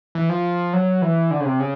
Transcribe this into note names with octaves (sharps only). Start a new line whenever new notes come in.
E3
F3
F#3
E3
D3
C#3
C3
C#3